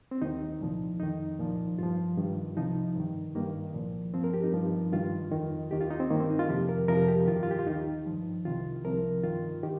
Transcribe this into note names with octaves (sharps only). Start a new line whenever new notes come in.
C4
D#2 D#3 D#4
C2 A#2 F3
F2 D#3 D#4
C2 A#2 F3
G2 F3 F4
G2 D#3
C2 C3 F3 D#4
G2 D#3
G2 D#3 A#3
C2 A#2 F3
G2 F3 C4
A#4
G4
D#4
G2 F3
G2 D#3 F4
F2 D#3
D#2 D#3 G4
F4
D#4
C4
G2 D#3 A#3
C4
D#4
F4
F2 C3 F3 G4
A#4
F2 C3 F3 A#4
G4
G2 D#3 F4 G4
F4
G4
F4
D#2 D#3 D#4
G2 F3
C2 C3 D#3 F4
C2 C3 F3 A#4
G2 D#3 F4
D#3 G4